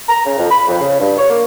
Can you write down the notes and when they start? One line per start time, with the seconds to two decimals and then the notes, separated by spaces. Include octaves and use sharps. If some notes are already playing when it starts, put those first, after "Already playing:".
0.09 A#5
0.26 C#3
0.38 F2
0.50 B5
0.68 F2
0.81 C#3
1.00 G2
1.18 C#5
1.30 A#3